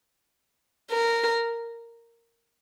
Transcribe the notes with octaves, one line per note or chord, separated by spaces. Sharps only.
A#4